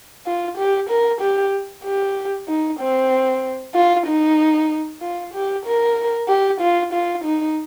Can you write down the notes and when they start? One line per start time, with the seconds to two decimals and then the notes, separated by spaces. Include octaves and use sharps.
0.26 F4
0.58 G4
0.90 A#4
1.21 G4
1.84 G4
2.48 D#4
2.80 C4
3.75 F4
4.07 D#4
5.02 F4
5.34 G4
5.66 A#4
6.29 G4
6.61 F4
6.93 F4
7.24 D#4